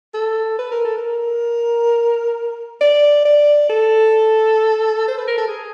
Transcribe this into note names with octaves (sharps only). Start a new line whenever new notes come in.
A4
B4
A#4
A4
A#4
D5
D5
A4
C5
B4
A#4
A4
G#4